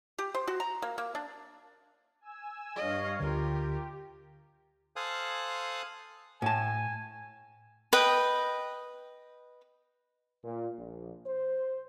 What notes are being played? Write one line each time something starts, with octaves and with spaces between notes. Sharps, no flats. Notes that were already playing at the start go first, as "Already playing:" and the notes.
G4
C5
F#4
A#5
A#3
A#3
D4
G#5 E6
G2 C#5 D#5 F5
D2 D3 F4 G4 A#4
A4 C5 F5 G#5 D#6 F#6
A2 G#5 A5
B4 D#5 G5
A#2
A#1
C5